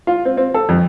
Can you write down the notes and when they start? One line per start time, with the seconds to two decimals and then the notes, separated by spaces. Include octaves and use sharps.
0.07 F4
0.25 C4
0.37 C4
0.54 A4
0.69 F2